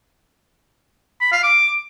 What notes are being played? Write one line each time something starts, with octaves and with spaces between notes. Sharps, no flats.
B5
F5
D6